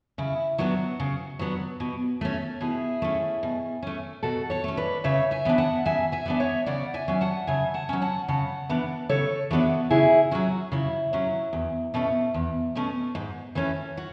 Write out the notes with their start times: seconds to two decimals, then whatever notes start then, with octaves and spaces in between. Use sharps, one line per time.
0.18 C#3 E4
0.58 F#3 B3 D4 F#4
1.00 C#3
1.39 F#3 B3 D4
1.80 B2
2.21 A3 C#4
2.61 B2 E4 G#4
3.02 A3 C#4
3.43 B2
3.83 A3 C#4
4.23 B2 F#4 A4
4.50 A4 C#5
4.64 A3 C#4
4.77 B4 D5
5.04 C#3 C#5 E5
5.31 E5 G#5
5.45 E3 B3 D4
5.58 F#5 A5
5.85 C#3 E5 G#5
6.12 E5 G#5
6.26 E3 B3 D4
6.40 C#5 E5
6.66 C#3 D5 F#5
6.94 E5 G#5
7.08 F#3 C#4
7.21 F#5 A5
7.47 C#3 E5 G#5
7.74 F#5 A5
7.89 F#3 C#4
8.02 F#5 A5
8.28 C#3 F#5 A5
8.69 E3 B3 D4
9.09 C#3 A4 C#5
9.51 E3 B3 D4 F#4 A4
9.90 C#3 E4 G#4
10.31 F#3 C#4 F#4
10.72 C#3 E4
11.13 F#3 C#4
11.53 E2
11.94 B2 A3 C#4
12.34 E2
12.75 B2 A3 C#4
13.15 G#2
13.55 E3 A3 C#4
13.97 F#4